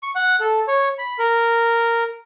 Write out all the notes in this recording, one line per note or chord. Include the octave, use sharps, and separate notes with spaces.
C#6
F#5
A4
C#5
B5
A#4